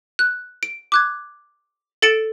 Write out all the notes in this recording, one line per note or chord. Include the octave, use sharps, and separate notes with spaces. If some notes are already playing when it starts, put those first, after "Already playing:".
F#6
D7
D6 F#6 G#6
A4 A6 C#7 D7 E7